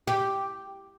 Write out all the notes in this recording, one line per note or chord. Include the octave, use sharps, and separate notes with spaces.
G4